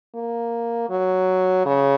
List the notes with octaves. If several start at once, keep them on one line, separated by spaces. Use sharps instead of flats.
A#3
F#3
C#3